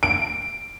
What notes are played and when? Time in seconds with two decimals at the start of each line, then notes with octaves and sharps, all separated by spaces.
0.03 D7